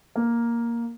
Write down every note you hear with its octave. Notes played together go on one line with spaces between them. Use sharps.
A#3